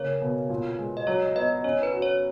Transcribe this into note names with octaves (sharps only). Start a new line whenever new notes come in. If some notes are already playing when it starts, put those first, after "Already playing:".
Already playing: C#3 A#3 C#5
B2
A#2
G#3
D#5
F#3 C#5
B3 D#5
C#4 C#5
B4
F#4
C#5